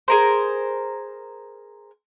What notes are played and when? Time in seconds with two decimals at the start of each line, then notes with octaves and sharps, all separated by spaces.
0.08 G#4 A#4 C5